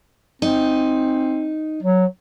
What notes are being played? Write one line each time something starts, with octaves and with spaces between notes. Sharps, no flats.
C4 D#4
F#3